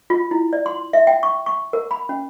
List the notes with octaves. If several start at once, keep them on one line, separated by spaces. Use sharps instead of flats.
F4
E4
D5
C6
E5
G5
C#6
C#6
A#4
B5
C#4